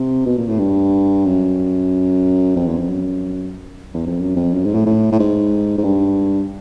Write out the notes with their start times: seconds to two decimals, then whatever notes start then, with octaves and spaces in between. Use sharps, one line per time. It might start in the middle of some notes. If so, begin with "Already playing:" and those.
Already playing: C3
0.26 B2
0.38 A#2
0.48 A2
0.59 G2
1.25 F#2
2.56 F2
2.68 E2
2.79 F2
2.89 F#2
3.94 E2
4.06 F2
4.21 F#2
4.36 F2
4.53 F#2
4.65 G#2
4.74 A2
4.86 A2
5.12 A2
5.19 G#2
5.78 G#2
5.84 G2